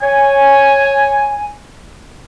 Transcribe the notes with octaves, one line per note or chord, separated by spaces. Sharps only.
C#5 G#5